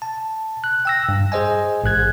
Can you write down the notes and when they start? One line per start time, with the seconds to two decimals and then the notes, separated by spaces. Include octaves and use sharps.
0.02 A5
0.64 F#6
0.85 G5 E6 A#6
1.09 G2
1.32 G#4 C5 D#5 G#5
1.84 A1 G#2 F#6 G#6